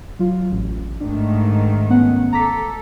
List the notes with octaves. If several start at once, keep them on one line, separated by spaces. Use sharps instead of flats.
F#3 F4
A1
G#2 D#3 A3 D4
B3 C#4 F#5
A4 A#5 D6 B6